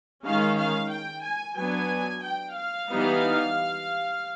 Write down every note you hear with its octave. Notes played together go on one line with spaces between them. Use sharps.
D#3 G#3 C#4 F5
F5
G5
G#5
F#3 B3 D4 G#5
G5
F5
E3 G3 B3 D#4